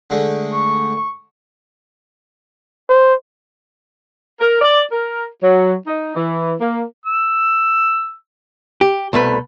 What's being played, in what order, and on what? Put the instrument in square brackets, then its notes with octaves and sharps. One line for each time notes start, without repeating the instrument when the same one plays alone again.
[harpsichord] D3 G#3 A3
[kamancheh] C#6
[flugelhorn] C5
[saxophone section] A#4
D5
A#4
F#3
D#4
E3
A#3
[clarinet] E6
[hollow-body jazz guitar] G4
C2 B2 A3 B4